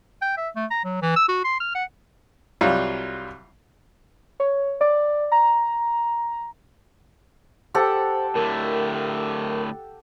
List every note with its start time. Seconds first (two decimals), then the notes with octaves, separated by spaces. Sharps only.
0.22 G5
0.37 E5
0.56 A3
0.70 A#5
0.84 F#3
1.02 E3
1.16 E6
1.29 F#4
1.44 C6
1.60 F6
1.75 F#5
2.61 C2 F#3 G3 F4
4.40 C#5
4.81 D5
5.32 A#5
7.74 G4 A4 C5 F#5
8.35 A2 D3 A3 A#4